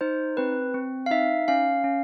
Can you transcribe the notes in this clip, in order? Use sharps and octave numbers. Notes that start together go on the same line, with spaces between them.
D#4 C5
C4 B4
C4
F5
D#4 E5
C#4 F5
C#4